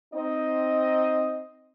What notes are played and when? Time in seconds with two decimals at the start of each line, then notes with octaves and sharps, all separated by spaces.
0.14 C4 D#4 D#5